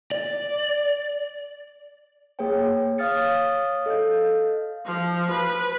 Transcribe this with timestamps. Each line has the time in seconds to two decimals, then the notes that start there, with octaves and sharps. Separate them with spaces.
0.11 D5
2.39 A#3 G#4 B4 C#5 G5
2.98 C#5 F5 D#6 F6 A6 C#7
3.86 A4 D#5 F5 G6
4.86 F3
5.31 B4